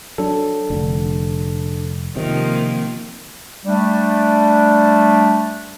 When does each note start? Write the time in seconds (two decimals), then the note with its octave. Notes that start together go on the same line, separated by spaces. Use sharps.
0.18 F#3 D4 A4
0.70 F1 D3
2.16 C3 D#3 F3 A#3
3.66 G3 A3 D4